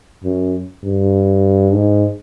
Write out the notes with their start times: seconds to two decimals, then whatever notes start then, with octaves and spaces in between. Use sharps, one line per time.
0.24 F#2
0.84 G2
1.73 G#2